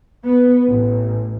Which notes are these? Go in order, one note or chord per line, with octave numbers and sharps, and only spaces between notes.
B3
A1